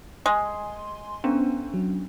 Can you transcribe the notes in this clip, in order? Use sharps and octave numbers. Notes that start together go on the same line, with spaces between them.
G#3 G#5 C6
B3 C#4 D4
F#3